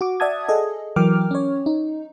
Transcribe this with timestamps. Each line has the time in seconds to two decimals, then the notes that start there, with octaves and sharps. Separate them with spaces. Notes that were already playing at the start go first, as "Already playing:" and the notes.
0.01 F#4 D6
0.20 D5 E5 F#5 A5 D#6 G#6
0.48 G#4 A4 D#5
0.96 E3 F#3 A#4 G5 D6 F6
1.31 C#4 C#5
1.66 D#4